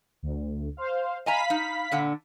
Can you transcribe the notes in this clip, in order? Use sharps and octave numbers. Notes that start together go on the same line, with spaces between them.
D2
C5 F5
D#5 F5 G#5 A#5 B5 B6
D#4
A#2 D3 F#5